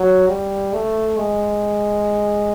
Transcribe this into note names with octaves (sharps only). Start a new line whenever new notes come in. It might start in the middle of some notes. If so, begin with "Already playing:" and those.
Already playing: F#3
G3
A3
G#3